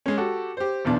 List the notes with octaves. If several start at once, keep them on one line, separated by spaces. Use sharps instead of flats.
G#3 C#4
F#4 G4 A4
G4 C5
B1 E2 D4